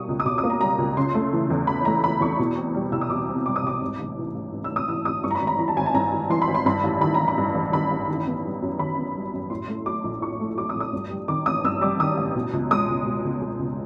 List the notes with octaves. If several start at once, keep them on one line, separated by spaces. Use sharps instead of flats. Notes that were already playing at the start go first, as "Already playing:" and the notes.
Already playing: B2 G3 A#3 C#6 D#6
C#2
D#6
B2 D6
D#6
A#3
A#5
G3 A#5
C#2
C#3 C6
A3
E3
E2
C#3 B5
A3 A#5
E3 B5
E2 C#6
B2
C4
G3
C2 E6
D#6
B2 D6
C4
G3 D6
D#6
C2 D6
G#2
A1
E3
A1
G#2
E6
A1
D#6
E3 E6
A1 D#6
G2 C#6
A#5
B5
G#1
A#5
E3 A#5
A5
G#1 G#5
A5
G2 A#5
G#1
E3 C6
B5
G#1
C6
G2 B5
A1
D#3 B5
A#5
A1
B5
G2
A1
D#3 B5
A1
D#3
B3
G3
F#2
D#3 B5
B3
G3
F#2
A2 C6
A3
F#3 D6
A#1
A2 C#6
A3
F#3 D6
D#6
A#1
D#6
G2
G3
D#3 D6
A1 D#6
G2 E6
G3 D6
D#3 D#6
A1
B2
C#2
G#3 D#6
C#2
B2
C#2
G#3
C#2